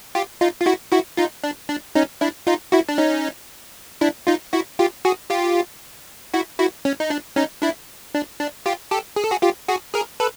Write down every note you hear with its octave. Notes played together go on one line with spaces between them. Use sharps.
F4 G4
D#4 F4
F4
E4 F#4
E4 F#4
D#4 F4
D4
D4
C#4 D#4
D4 E4
D#4 F4
E4 F#4
D4
C#4 D#4
D4 E4
D#4 F4
E4 F#4
F4 G4
F#4 G#4
F4 G4
E4 F#4
E4 F#4
C#4
D#4
D4
C#4 D#4
D4 E4
D4
D4
F4 G4
G4 A4
G#4
A4
F#4 G#4
F4 G4
F#4 G#4
G#4 A#4
A4 B4